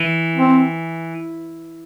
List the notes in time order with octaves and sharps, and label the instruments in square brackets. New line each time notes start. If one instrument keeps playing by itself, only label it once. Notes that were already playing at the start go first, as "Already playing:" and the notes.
Already playing: [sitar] E3
[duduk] C4